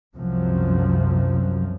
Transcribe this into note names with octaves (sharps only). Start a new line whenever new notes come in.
C2 F#2 C3 F3 F#3